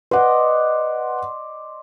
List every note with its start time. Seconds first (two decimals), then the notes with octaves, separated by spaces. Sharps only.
0.11 B4 C5 D5 D#5 F#5